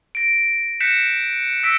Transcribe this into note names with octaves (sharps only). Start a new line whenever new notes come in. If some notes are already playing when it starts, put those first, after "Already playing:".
A#6 D7
F#6 G6 A#6 B6 C#7 E7
E6 A#6 B6 C#7 D7